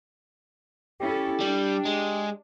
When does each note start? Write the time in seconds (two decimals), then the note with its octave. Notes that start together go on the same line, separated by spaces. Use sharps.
1.00 C#4 E4 G4 A4
1.41 G3 D4
1.85 G#3